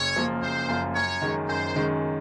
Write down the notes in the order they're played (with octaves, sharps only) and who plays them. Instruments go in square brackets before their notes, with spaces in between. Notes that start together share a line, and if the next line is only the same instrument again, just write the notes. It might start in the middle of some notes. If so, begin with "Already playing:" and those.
Already playing: [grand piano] F#1 [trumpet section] C#5
[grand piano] F#2 F3 A#3 F4
[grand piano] F#1 [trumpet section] C5
[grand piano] F#2 F3 A#3 F4
[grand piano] F#2 [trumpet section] C#5
[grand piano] D#3 G#3 C#4
[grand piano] F#2 [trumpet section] C5
[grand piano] D#3 G#3 C#4